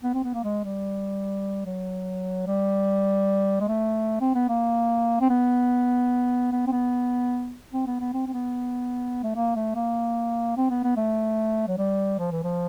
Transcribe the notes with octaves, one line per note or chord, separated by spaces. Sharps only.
B3
C4
B3
A#3
G#3
G3
F#3
G3
G#3
A3
C4
B3
A#3
C4
B3
B3
C4
B3
C4
B3
B3
C4
C4
B3
A3
A#3
A3
A#3
C4
B3
B3
A3
F#3
G3
F3
E3
F3